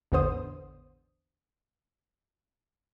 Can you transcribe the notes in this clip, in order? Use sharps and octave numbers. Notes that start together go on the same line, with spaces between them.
A1 E2 D3 B3 C5 D#6